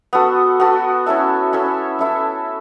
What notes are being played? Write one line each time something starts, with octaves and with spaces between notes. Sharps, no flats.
B3 F#4 A4
B3 F#4 A4
C#4 E4 A4 E5
C#4 E4 A4 E5
C#4 E4 A4 E5